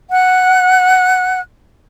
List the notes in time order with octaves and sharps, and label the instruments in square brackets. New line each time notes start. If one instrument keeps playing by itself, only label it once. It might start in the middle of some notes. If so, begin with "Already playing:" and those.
[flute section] F#5 F#6